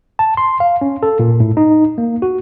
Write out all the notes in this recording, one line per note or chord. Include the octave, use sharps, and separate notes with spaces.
A5
C6
F5
C#4
A4
A#2
A2
D#4
A#3
F#4